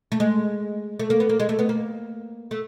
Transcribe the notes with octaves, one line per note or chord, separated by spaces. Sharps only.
A3
G#3
A3
A#3
B3
A#3
G#3
A3
B3
A#3
A3